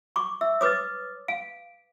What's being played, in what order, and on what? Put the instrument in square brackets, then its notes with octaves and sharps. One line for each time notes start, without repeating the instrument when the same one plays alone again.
[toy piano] C#6 D6
[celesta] E5 [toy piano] E6
[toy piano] B4 D6 D#6 [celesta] C#5 F6 A6
[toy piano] F5 [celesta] D7